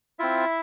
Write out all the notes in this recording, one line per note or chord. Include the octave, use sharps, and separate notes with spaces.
C4 E4 F4 E5